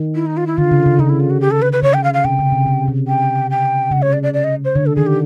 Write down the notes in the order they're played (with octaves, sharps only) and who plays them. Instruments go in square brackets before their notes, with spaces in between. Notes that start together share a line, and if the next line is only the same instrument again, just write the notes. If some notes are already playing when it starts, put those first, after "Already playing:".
Already playing: [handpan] D#3
[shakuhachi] E4
D#4
F4
E4
[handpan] D3 [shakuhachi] F4
[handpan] C#3
C#3
[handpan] C#3 [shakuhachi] D#4
[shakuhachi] E4
F4
F#4
G4
A4
B4
B4
[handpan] C#3 [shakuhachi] C#5
[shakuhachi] G5
F5
F5
[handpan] C3 [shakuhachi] G5
[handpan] C#3
C3
C#3
C3
[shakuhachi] G5
G5
[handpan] C#3 [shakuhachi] F#5
[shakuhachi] C#5
D5
D5
D5
D#5
C5
[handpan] D3 [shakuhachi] C#5
[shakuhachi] A4
[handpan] D#3 [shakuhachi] G#4
[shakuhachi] G4